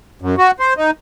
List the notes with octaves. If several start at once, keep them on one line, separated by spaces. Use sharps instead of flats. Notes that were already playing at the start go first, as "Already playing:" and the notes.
F#2
F#4
C5
D#4